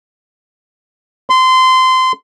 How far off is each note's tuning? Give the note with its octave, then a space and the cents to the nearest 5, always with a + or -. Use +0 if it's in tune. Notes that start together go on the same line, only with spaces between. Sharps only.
C6 -20